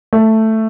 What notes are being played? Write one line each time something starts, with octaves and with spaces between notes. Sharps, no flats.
A3